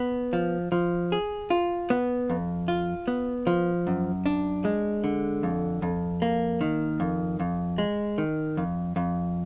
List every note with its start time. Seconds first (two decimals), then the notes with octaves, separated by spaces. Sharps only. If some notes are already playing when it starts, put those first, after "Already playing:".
Already playing: B3
0.33 F3
0.72 F3
1.12 G#4
1.50 F4
1.90 B3
2.29 F2
2.68 F4
3.08 B3
3.47 F3
3.87 F#2
4.26 D4
4.65 G#3
5.04 D3
5.43 F2
5.82 F2
6.22 A#3
6.61 D#3
7.00 F2
7.40 F2
7.78 G#3
8.18 D#3
8.57 F2
8.96 F2